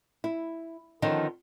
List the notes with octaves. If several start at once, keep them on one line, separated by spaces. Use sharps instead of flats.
E4
D3 D#3 F3 B3 C#4 D#4